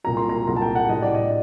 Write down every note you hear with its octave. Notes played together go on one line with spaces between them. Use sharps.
C2 A#2 F#3 A#5
C6
A#5
C2 A#2 F#3 A#5
A5
G5
F#5
A2 G3 D4 D#5
D5
D#5